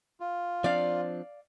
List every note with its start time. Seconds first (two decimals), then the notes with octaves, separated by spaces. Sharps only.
0.20 F4
0.64 F3 C4 D4 D5 F5